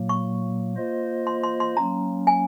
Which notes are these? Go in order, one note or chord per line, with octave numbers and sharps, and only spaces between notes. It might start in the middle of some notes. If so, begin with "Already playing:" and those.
Already playing: A#2 F#3 A#3
C#6
A#3 F4 C5 D#5
C6
C6
C6
F#3 A#3 C#4 A#5
G#5